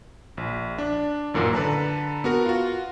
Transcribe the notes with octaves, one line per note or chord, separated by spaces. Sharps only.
A#1
D4
A1 F#2 A#2 D#3
D3 B4 A5 A#5
B3 F#4 A#4
F4 F#4